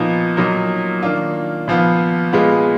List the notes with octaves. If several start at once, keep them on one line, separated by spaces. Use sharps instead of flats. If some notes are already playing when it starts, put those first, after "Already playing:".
Already playing: A#2 F3 B3 D#4
A#2 F#3 A#3 D#4
D#3 A#3 D4 F4
A#2 F3 B3 F4
A#2 G#3 B3 F4